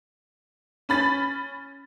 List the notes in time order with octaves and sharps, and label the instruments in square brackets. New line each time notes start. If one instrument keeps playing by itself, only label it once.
[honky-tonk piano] C#4 B5 A6